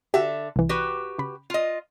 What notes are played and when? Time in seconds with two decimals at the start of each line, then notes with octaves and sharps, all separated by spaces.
0.14 D3 F#4 G4 A4 E5
0.56 C2 E3
0.69 F#4 G4 B4
1.19 C#3 B5
1.50 F4 D#5